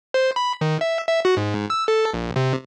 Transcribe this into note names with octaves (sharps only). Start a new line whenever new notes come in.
C5
B5
D#3
E5
E5
F#4
G#2
E6
A4
A#1
C3